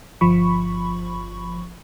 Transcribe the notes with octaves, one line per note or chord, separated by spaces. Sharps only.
G1 F3 B5 C#6